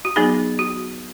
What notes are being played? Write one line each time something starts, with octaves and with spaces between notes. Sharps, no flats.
F#4
F#3 B3 D#4 G#4
F#4